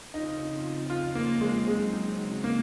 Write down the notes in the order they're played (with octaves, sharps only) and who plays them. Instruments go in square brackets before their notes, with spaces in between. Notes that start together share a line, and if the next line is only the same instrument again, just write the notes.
[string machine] F2 C#3 F3 C4 F4 [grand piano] D#4
[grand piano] F4
A#3
G#3
[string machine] C#3 F#3 C4 D#4 [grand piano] G#3
[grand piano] A#3